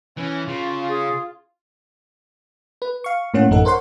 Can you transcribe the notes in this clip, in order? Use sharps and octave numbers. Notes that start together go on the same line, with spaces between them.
E3 C#4
C#3 F4
G#4
B4
F5 C#6
A2 A#3 C#4 F#5
A1 F#2 D#4 A4 F#5
A#4 C5 C#5 F#5 C6